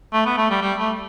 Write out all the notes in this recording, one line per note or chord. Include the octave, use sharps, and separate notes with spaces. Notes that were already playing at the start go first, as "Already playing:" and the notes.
A3
B3
A3
G3
G3
A3